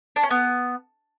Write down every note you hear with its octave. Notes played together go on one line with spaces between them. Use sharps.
D4
C#4
B3